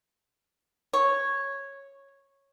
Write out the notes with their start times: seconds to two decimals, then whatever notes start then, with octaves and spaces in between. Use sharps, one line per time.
0.93 C#5